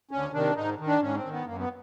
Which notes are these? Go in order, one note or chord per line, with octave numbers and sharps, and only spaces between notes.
D2 C#4
C3 D#3 D4
G#2 D#4
D#3
D4
G#2 C#4
C4
D#3
B3
F#2 A#3
B3